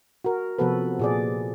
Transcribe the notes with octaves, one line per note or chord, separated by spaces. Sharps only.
F#4 A#4
C3 F3 B3 F#4 A4 B4
A#2 G#4 D5